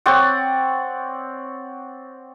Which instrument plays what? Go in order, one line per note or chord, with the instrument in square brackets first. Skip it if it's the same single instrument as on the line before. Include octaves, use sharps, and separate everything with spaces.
[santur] C4 C#5 D5 F#5